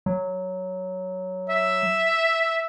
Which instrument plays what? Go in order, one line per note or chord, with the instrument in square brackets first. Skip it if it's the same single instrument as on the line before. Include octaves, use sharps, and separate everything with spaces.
[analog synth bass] F#3
[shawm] E5